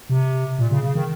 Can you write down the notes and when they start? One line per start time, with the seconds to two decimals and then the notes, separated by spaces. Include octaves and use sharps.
0.10 C3
0.59 A#2
0.71 C#3
0.84 C#3
0.96 D#3